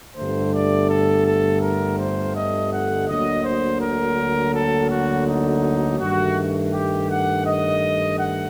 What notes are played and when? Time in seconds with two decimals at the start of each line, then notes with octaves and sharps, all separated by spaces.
0.17 G1 G2 D3 A3 C5
0.54 D5
0.90 A4
1.26 A4
1.62 A#4
1.99 C5
2.36 D#5
2.72 F#5
3.09 D2 D3 F#3 A#3 D#5
3.45 C5
3.81 A#4
4.54 A4
4.91 F#4
5.28 D#4
6.00 G2 D#3 A3 F#4
6.73 G4
7.09 F#5
7.46 D#5
8.19 F#5